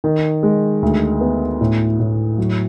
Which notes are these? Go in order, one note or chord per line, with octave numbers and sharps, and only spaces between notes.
D#3
G#3
D2
B3
A2
A2
F#3